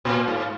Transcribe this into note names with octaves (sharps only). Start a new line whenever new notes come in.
A#2
G#2